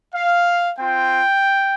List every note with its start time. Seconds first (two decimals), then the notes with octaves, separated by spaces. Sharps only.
0.15 F5
0.78 C4 F4 G5